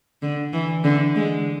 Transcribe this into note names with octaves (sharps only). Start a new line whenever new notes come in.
D3
E3
D3
G#3